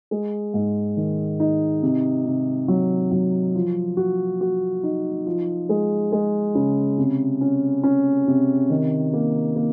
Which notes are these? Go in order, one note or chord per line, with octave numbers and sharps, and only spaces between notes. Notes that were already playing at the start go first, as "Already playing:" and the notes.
G#3
G#2
D#3
D#4
C3
C3
F#3
F#3
F3
F#4
F#4
D#4
F3
G#3
G#3
C#3
C3
C#4
C#4
C3
D#3
A#3
A#3